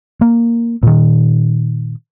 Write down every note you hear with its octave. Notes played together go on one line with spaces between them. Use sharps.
A#3
A#2 D#3